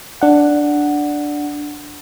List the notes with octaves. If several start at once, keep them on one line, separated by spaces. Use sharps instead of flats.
D4 F#5